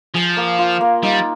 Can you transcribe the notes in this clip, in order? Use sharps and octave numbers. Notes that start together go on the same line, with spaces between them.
F3 G#4
A#3
F4
A#3
G3 D#4